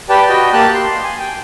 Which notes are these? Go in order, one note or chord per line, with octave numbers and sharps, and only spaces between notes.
G4 B4 D5 G5 A5
F#4 D#5 G5
A#3 G4 A5 F#6
C6
G#5
G5